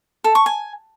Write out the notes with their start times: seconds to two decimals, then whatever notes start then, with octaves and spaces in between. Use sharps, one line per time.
0.24 A4
0.35 C#6
0.46 G#5